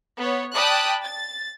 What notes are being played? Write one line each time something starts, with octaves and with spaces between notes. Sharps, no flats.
B3 C#5
D5 G5 A5 B5 D#6 F#6
A6